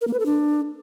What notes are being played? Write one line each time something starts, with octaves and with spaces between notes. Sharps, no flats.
A#4
A#3
B4
A4
D4